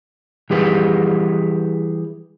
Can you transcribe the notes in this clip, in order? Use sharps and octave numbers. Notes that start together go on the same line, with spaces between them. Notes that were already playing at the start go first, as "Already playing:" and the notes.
E3 G3 G4 G#4 B4